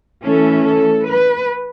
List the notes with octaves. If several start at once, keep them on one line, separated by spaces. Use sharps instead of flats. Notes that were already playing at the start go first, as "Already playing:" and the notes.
E3 A3 C#4 A4
A4
B4